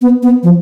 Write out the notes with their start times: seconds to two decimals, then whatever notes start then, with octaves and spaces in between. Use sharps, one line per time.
0.02 B3
0.23 B3
0.43 F3